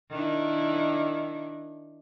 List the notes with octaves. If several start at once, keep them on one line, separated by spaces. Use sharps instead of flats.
D#3 D4 E4